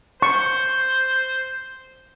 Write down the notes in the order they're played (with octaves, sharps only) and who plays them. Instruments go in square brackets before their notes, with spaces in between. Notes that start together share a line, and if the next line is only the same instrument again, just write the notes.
[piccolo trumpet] C5 [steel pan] C#6